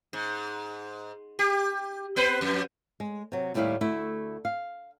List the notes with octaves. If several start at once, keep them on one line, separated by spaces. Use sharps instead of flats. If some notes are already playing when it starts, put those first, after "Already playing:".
G#2
G4
B3 B4 C5
F2
G#3
C3 F#3
D#2 A2 G3 E4 G4 F5
D2 A3 E4
F5